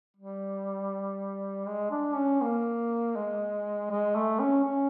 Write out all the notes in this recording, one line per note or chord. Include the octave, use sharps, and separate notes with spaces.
G3
G#3
D4
C#4
A#3
G#3
G#3
A3
C#4
C#4